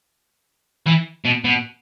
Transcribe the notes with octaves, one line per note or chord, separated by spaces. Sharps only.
E3
B2
B2